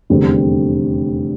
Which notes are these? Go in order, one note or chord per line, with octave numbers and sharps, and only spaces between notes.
F1 E2 D3 G3 C4